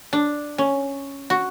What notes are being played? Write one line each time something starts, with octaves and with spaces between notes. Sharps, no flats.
D4
C#4
F#4